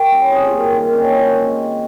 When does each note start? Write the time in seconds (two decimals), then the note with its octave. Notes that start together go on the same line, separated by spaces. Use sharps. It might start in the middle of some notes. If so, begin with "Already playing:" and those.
Already playing: G4 A#4
0.11 G3 C#4
0.31 C3 G#4
0.46 F4
0.53 G3 A#3
0.60 F4
0.74 D#3
0.93 G3 C4 C#4
1.04 D#4
1.15 D#3 F4
1.37 G#3 C4
1.57 C3